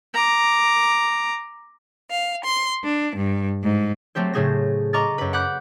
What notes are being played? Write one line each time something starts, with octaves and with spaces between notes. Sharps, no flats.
A#5 D6
F5
C6
D4
G2
G#2
F#3 A3 C4 G4 C5
A2 C#3 A3 G#4 C5 A#6
D#5 A#5 C#6 D6 F6 A6
F#2 B4
F#5 B5 D6 F#6 G6